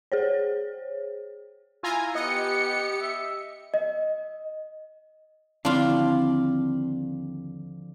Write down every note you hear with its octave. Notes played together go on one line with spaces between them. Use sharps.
G#4 C5 C#5
E4 F4 G#5 A#5
B3 G4 D#5 C#7
E5
D#5
D#2 D3 F3 C4 D4 E4 F4 F5